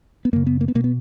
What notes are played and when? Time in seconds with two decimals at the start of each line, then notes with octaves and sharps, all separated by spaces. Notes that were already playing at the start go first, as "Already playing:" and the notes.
0.25 B3
0.33 F#2 C#3 A#3
0.47 B3
0.61 A#3
0.68 B3
0.75 B2 A#3
0.84 B3